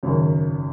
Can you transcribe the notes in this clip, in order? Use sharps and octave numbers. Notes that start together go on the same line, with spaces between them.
G#1 F#2 C#3 C#5